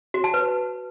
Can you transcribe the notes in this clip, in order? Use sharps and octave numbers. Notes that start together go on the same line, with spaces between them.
F#4
A5
B4